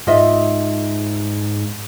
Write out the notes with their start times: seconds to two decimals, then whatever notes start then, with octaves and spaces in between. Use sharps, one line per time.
0.07 G#2 F4 D#5 E5